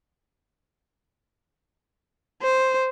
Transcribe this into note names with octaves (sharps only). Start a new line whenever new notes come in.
C5